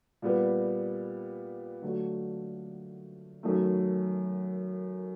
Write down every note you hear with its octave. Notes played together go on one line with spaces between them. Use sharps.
A#2 G3 B3
D3 F#3 A3
F#2 D#3 F#3 A3